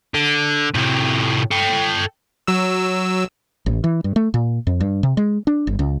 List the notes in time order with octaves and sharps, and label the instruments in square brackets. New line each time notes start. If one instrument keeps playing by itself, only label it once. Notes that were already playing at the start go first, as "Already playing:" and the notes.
[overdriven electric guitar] D3
A2 C3
A4 G5
[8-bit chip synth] F#3 E6
[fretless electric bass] A1
E3
G2
A3
A#2
F2
G2
C3
G#3
D4
G1
C#2